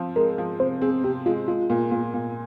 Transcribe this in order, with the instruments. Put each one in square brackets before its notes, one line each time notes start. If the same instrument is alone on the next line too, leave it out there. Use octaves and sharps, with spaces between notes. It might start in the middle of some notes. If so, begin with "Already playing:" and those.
Already playing: [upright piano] F3 C4
[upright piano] G#3 [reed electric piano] A#4
[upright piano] F3
[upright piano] C3 [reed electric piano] C5
[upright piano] C4 [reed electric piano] G#4
[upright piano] C3 [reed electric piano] G4
[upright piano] G#3 [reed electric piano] F4
[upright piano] G#3 [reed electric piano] F4
[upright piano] A#2
A#2
A#2